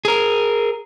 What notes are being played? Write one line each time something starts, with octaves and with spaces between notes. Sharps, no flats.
G#4 A#4